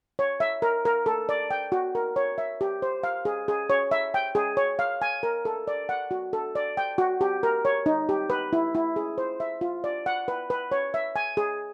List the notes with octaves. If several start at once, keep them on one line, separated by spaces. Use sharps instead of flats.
C#5
E5
A#4
A#4
A4
D5
G5
F#4
A#4
C#5
E5
G4
C5
F5
G#4
G#4
C#5
E5
G5
G#4
C#5
F5
G#5
A#4
A4
D5
F#5
F#4
A4
D5
G5
F#4
G4
A#4
C#5
D#4
G4
B4
E4
E4
G#4
C5
E5
F4
D5
F#5
B4
B4
C#5
E5
G#5
G#4